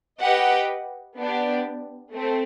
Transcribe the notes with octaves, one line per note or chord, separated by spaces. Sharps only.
G4 B4 D#5 F#5
B3 D4 G4
A3 C4